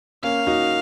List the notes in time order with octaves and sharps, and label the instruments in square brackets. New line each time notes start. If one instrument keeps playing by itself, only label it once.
[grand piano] A#3 C#4 [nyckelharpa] F5
[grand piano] D#4 F#4